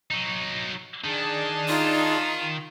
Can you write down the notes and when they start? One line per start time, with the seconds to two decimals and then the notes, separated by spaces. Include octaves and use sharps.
0.11 F#3 D#4
1.04 D#3 D4 G#4 A5
1.68 D#4 F4